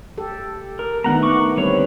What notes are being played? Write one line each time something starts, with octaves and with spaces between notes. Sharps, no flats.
G4 A4
A#4
D#3 A3 B3 D4 F#5 A#5
F#5 C#6 D6
D3 G3 C4 B4 C#5